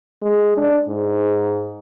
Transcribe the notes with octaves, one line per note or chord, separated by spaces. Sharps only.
G#3
D4
G#2